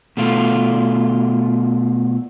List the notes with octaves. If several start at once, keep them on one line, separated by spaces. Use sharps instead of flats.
B2 A3 F4